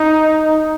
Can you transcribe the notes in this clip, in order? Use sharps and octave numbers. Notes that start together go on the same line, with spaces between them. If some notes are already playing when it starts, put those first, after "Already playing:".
Already playing: D#4